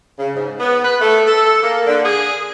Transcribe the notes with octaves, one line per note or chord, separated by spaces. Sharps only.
C#3
G#2
B3
B4
A3
A4
A#3
D3
G#4